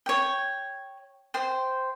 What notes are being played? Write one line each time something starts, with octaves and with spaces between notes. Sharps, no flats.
C#5 G5
C5 G5